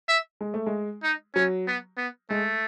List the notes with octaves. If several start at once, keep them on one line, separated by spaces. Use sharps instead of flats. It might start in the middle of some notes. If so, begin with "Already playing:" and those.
E5
G#3
A3
G#3
D#4
F#3 C#4
B3
B3
G#3 A3